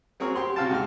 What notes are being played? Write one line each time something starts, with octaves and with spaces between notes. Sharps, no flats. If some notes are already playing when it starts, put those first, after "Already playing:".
F#3 C4 G#4 A#4 C#5
G4 C6
C3 F#4 F5 G5 A5
G#2 F6